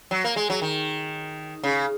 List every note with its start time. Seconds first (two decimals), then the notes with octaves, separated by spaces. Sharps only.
0.11 F#3
0.24 A#3
0.36 G#3
0.50 F#3
0.62 D#3
1.63 C#3